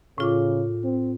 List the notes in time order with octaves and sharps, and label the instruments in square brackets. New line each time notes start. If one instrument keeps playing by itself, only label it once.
[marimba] A2 F4 D6 [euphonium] C#3
[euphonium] C4